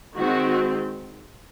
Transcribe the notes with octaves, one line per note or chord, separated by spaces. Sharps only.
D#3 G#3 C4 F#4